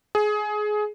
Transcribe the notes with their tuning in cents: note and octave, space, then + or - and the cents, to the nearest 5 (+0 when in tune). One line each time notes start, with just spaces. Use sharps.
G#4 +20